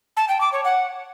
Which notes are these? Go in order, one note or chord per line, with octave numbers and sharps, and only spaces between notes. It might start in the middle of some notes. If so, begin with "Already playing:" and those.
A5
G5
D6
C#5
F#5